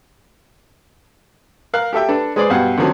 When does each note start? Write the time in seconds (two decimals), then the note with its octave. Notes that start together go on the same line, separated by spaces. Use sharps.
1.74 A#4 F5 F#6
1.93 G4 A4 E5 G5
2.09 D4 A4 B4
2.36 G#3 G#4 B4 C5 D5
2.50 G2 B2 F5 F#5
2.77 D3 D#3 F3 F#3 A#3 C4